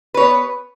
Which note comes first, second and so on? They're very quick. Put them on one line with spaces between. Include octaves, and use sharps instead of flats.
B4 C#5 B3